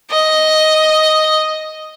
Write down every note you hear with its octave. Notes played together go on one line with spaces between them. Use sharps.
D#5